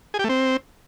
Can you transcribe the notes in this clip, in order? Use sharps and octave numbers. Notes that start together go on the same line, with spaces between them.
G#4
G4
A3
C4